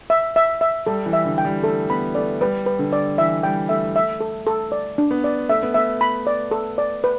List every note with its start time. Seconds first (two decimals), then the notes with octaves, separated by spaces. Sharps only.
0.10 E5
0.36 E5
0.61 E5
0.87 G3 A4
1.06 E3
1.13 E5
1.25 D3
1.38 G5
1.45 G3
1.64 A3 A4
1.90 B3 B5
2.15 A3 D5
2.41 G3 B4
2.66 B4
2.79 D3
2.93 D5
3.18 E3 E5
3.43 G3 G5
3.69 A3 E5
3.96 E5
4.21 A4
4.47 A4
4.72 D5
4.98 D4
5.11 B3
5.24 D5
5.49 A3 E5
5.63 B3
5.74 A3 E5
6.01 B5
6.27 D5
6.51 A4
6.78 D5
7.04 B4